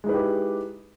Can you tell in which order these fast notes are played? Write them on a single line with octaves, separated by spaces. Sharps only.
G#3 D#4 B4 E4 G4